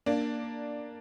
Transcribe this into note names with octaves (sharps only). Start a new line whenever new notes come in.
A#3 D4